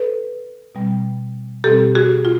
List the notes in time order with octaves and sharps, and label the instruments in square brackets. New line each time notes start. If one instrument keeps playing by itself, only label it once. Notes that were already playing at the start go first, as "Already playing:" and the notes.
Already playing: [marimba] A4 B4
B2 G3 C4
B2 G3 C4 G4 A4
F#4 G#4
F4